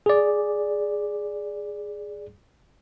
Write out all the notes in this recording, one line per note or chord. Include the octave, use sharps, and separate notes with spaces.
G#4 D5